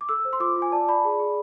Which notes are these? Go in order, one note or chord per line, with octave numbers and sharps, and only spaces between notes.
D6
A4 E6
C5
C6
F4 D6
F4
G#5
D5 A5
D5 B5
G#4
G#4